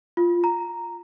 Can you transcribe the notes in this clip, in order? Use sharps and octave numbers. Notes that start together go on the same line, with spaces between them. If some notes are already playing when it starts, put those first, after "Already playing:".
F4
A#5